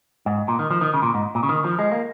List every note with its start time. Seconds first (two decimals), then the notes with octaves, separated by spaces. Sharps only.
0.26 G#2
0.48 A#2
0.59 D#3
0.71 F3
0.81 D#3
0.94 C#3
1.02 A#2
1.14 G#2
1.35 A#2
1.43 C#3
1.49 D#3
1.64 F3
1.79 G#3
1.92 A#3